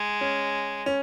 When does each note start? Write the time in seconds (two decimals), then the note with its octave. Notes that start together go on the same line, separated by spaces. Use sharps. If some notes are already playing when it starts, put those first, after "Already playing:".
Already playing: G#3
0.21 C#4
0.86 C#4